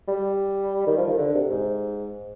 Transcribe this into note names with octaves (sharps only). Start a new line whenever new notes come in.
G3
D#3
F3
D#3
D3
C3
G#2